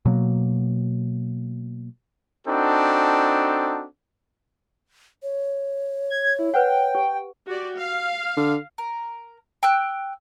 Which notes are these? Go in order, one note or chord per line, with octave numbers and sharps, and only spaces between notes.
B2 F#3 A#3
C4 D4 D#4 F#4 A4
C#5
G#6
E4
B4 C5 F#5 G5
G4
F#4 G4 D5
F5
D3
A#4
G5 E6 F#6